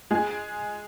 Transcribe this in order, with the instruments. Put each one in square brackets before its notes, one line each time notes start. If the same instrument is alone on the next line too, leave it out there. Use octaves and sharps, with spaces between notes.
[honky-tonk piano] G#3 G#4